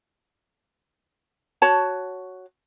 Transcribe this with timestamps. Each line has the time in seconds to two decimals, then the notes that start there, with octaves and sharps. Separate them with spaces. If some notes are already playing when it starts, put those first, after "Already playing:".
1.62 F#4 C#5 A5